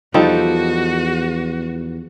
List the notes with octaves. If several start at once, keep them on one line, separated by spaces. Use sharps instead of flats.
E2 F3 G3 D#4 F#4 A4